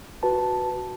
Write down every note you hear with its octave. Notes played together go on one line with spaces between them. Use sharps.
F#4 B4 A5